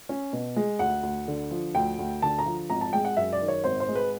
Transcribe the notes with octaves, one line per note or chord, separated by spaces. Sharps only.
C#4
B2
G#3
D2 F#5
D2
D3
F3
D2 G5
D2
D3 A5
A#5
F3
G#1 A#5
A5
G#3 G5
F#5
F#2 E5
D5
D#3
C#5
G#1 C5
C5
G#3
B4